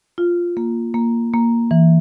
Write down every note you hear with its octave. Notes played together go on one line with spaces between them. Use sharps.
F4
A#3
A#3
A#3
E3